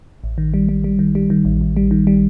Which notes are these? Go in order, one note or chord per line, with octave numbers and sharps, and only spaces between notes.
A1
D#3
G3
G3
G3
D#3
G3
D#3
A1
A1
G3
D#3
G3